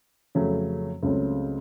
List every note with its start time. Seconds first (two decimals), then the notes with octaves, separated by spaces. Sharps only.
0.35 F2 C#3 F#3 A3 C#4
1.03 C#2 C#3 F#3 A3 C4